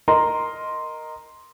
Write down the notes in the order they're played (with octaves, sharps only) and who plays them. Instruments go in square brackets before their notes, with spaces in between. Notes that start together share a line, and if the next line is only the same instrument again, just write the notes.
[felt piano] A#4 D#5 A#5 C6